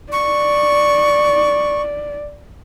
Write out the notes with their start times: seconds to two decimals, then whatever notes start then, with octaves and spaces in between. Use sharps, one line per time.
0.12 D5 C#6